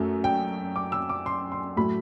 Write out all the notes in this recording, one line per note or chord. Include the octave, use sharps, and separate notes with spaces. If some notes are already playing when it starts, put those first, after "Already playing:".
Already playing: F#2 F#3 A3
G5
D6
E6
D6
C6
C6
A2 F#3 A3 B5